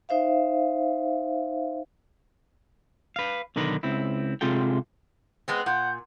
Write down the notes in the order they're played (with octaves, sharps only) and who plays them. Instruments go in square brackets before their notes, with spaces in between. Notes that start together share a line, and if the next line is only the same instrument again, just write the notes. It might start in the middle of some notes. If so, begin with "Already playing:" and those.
[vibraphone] D#4 C5 E5 F5
[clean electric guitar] B4 F5
B1 D3 D#3 A#4 B4
C#2 C4 E4
C3 G#3 F4 A4 G5
[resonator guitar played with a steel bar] G#3 B3 C4
[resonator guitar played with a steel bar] A#2 [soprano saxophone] F#5 [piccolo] G6